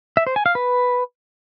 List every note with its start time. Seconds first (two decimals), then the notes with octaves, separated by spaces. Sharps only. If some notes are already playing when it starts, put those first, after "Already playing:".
0.17 E5
0.27 C5
0.36 G#5
0.46 F5
0.55 B4